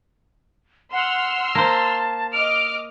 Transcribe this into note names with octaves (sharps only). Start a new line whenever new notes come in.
F#5 C6 E6 F6
A#3 C5 A5
D#5 D6 F6 D7